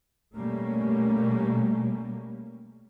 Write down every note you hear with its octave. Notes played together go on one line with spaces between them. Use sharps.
B2 G3 A3 A#3 C#4